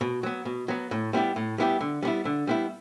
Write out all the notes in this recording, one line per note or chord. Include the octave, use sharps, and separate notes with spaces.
B2
F#3 B3
B2
F#3 B3
A2
G3 B3 E4 G4
A2
G3 B3 E4 G4
D3
G3 B3 E4
D3
G3 B3 E4